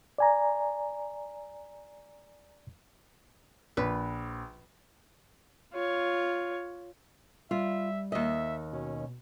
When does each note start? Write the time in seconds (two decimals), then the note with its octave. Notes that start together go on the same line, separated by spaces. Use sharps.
0.19 D5 G#5 A#5
3.77 A#1 B4
5.73 F4 C#5
7.51 G3 F4 E5
8.12 D#2 D#5 E5
8.72 B2 C#4